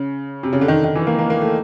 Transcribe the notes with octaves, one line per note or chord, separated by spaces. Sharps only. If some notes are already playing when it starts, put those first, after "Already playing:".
Already playing: C#3
C3
C#3
D3
D#3
D3
D#3
E3
A#3
A#3
A#3
A3